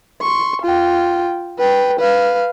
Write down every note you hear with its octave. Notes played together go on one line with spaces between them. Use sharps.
C6 C#6
F4 G5
B4 G5
B4 F5